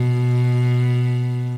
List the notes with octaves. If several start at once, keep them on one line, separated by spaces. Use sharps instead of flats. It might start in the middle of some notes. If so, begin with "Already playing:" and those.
Already playing: B2